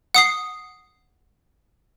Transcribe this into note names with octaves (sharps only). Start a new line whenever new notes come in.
F#5 D#6 C7